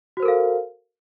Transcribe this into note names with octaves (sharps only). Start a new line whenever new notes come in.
F#4 A4 A#4 C5 F5